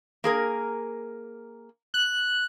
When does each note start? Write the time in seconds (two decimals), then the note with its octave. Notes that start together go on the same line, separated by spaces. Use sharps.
0.24 A#3 G#4 A#4
1.94 F#6